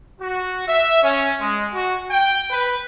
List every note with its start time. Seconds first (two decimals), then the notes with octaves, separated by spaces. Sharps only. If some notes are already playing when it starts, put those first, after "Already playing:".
0.21 F#4
0.68 E5
1.03 C#4
1.40 G#3
1.74 F#4
2.11 G5
2.51 B4